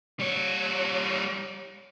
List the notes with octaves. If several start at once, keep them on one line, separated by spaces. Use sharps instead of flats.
G3 C#5